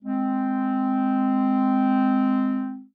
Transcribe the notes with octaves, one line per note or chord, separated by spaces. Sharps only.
G#3 C4